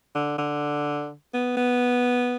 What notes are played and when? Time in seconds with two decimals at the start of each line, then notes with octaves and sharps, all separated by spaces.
0.15 D3
0.38 D3
1.34 B3
1.57 B3